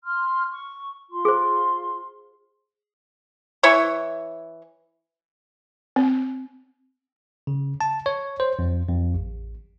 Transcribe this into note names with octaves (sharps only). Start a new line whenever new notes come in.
C6 F6
C#6
F4 C6
G#4 C5
E3 E4 C#5 C#6
C4
C#3
A5
C#5
C5
F2
F2
A1